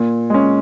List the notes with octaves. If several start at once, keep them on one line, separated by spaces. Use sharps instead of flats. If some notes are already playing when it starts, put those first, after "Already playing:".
Already playing: A#2
G#3 C#4